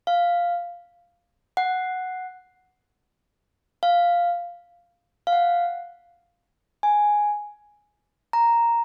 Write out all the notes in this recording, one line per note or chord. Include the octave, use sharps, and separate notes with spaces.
F5
F#5
F5
F5
F#5
G#5
A#5